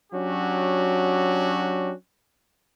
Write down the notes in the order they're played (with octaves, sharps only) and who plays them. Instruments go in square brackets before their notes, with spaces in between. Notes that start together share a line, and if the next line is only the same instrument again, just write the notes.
[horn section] F#3 C#4 D4 F#4 G4